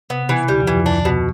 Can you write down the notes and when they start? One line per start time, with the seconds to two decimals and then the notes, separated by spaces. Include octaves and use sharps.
0.10 C3 B3
0.23 B2
0.29 E3
0.35 C3
0.48 D2 D3 G3
0.60 F2 F3
0.67 E3
0.73 F2 F3
0.86 D2 D3 D4
1.05 B2